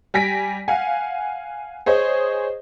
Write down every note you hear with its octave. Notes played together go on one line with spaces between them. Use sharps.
G3 G#5 A#6 B6 D7
F5 F#5 G#5
G#4 C5 C#5 D#5